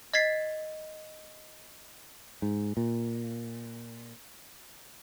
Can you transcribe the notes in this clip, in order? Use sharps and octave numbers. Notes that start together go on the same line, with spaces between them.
D#5 G#6 A6 B6 C7
G#2
A#2